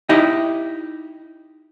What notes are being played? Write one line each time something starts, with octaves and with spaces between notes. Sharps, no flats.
D#4 E4 G4 D#5